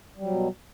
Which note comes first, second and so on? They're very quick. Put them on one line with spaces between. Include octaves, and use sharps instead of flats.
G3 F#3 B2